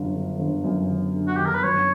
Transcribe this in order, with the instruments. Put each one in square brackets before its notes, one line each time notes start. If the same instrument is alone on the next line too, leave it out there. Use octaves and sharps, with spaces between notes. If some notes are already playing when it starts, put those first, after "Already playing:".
Already playing: [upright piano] G1 F#2
D3
G1
F#2
G1
D3
[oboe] F#4
[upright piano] G1 [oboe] G4
[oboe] A#4
B4
[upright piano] F#2 [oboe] C#5